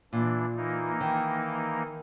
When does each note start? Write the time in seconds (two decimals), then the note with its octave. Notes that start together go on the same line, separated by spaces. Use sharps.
0.13 A#2 E3 D4
0.57 E3 A#3 D#4
1.01 D#3